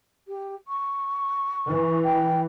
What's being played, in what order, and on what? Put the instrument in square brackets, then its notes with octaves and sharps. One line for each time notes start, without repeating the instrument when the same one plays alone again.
[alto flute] G4
C#6
[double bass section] E3
[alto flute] G5